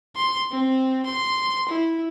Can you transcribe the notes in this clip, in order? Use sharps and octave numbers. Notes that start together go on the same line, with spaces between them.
C6
C4
C6
E4